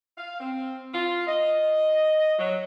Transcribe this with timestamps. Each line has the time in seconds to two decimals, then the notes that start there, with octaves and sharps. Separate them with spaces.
0.18 F5
0.40 C4
0.94 F4
1.27 D#5
2.39 F#3